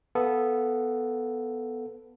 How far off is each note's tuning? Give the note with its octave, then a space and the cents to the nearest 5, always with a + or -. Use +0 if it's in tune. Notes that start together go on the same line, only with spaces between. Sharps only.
B3 +0 A4 +0 F5 +20